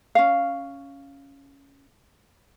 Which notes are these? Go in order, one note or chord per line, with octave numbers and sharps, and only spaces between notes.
C#4 F5